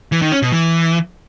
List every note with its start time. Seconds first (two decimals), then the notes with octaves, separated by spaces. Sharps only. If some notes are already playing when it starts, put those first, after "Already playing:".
0.12 E3
0.22 D#3
0.32 C#4
0.42 B2
0.52 E3